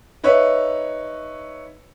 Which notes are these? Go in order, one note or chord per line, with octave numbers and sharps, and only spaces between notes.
D#4 B4 C#5 E5